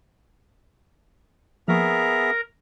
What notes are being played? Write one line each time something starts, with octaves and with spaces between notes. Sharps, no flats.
F3 A#3 B3 G#4 A#4 E5 A#5 C#6